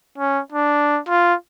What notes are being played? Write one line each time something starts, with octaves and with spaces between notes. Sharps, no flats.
C#4
D4
F4